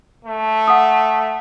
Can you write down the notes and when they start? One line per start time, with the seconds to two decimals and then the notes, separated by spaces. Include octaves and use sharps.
0.25 A3
0.68 F#5 D#6